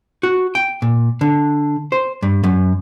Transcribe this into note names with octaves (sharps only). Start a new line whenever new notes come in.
F#4
G5
A#2
D3
C5
G2
F#2